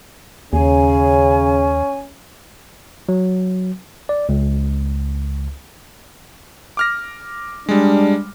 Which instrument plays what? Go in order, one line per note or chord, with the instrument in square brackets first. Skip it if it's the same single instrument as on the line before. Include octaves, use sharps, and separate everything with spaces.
[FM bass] D#2 [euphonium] C#3 [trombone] C#4 [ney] G#5
[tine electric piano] F#3
D5
C#2
[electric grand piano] D6 F6 A#6
[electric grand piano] G3 G#3 [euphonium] D4